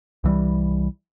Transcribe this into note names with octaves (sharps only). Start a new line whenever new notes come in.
C2 E3 G3